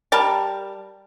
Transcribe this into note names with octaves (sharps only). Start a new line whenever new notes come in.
G3 A#4 A5